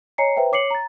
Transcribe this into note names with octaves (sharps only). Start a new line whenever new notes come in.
C#5 D#5 G#5 A#5 C7 C#7
B4 C5 E5 G5 A#5
C#5 D6 C7 C#7 F#7
A#5 A6